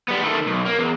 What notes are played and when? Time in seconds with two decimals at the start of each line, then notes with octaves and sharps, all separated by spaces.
0.09 G3 B3
0.23 D#3 A3
0.46 B1
0.65 A#3
0.79 E2